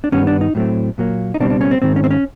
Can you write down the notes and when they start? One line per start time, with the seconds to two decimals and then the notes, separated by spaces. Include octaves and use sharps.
0.04 D4
0.12 G2 D#3 G3 B3 C#4
0.27 D4
0.41 D#4
0.55 A2 F#3 A3 C4
0.98 A#2 F#3 A#3
1.34 D#4
1.40 C#2 B2 G3 C4 D4
1.50 D4
1.61 C#4
1.71 C4
1.82 G#2 D#3 G#3 C4
1.96 C#4
2.04 C4
2.11 C#4